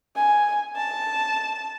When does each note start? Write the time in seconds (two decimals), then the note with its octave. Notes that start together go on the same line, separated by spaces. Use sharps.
0.16 G#5
0.76 A5